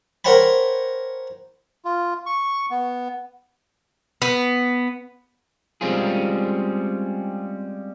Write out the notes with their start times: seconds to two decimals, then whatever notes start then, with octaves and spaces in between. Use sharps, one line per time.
0.25 A#4 C5 C#5 F#5 G5 B5
1.85 F4
2.26 C#6
2.71 B3
4.22 B3
5.81 G3 G#3 C4 C#4 F4 G#4